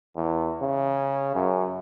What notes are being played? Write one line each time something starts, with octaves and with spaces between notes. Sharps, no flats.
E2
C#3
F#2